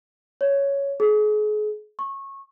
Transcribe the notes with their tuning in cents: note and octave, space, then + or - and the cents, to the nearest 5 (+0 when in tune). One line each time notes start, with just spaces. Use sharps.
C#5 +5
G#4 +35
C#6 -20